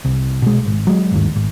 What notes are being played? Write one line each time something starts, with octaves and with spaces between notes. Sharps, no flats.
C2
B2 G#3
G#1
F#3 G#3
G1 D#2 G#2
G#1